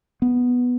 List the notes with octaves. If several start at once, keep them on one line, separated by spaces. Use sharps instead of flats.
B3